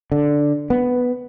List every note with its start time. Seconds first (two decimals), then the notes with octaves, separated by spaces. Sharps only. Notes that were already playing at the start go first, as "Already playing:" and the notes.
0.12 D3
0.70 B3